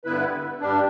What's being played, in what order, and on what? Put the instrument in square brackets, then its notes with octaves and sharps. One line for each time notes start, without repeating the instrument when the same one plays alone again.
[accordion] G2 D3 B3 E4 B4
G2 G3 D4